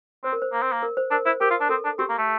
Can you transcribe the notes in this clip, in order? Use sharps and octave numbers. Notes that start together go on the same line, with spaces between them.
C4 C5
A#4
C5
A#3
C4
A#3
A#4
C5
D4 A#4
E4 C5
G4 A#4
F4
D4
C4 A4
D4
C4 G4
A#3
A3